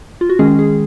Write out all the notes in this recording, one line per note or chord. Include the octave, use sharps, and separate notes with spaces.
F4
F#4
D#3 G#3 C#4 G#4
G#4